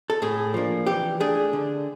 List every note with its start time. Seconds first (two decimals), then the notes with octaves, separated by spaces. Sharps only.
0.10 A4
0.22 A2 G#4
0.54 F3 A#3 D4
0.86 E3 G4
1.20 A3 D4 G#4
1.53 D3